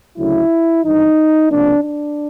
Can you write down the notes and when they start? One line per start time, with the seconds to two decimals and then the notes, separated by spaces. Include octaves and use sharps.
0.17 D2 C#3 F#3 A3 E4
0.84 G#1 G2 E3 D#4
1.50 C#2 C3 F3 A#3 D4
1.83 D4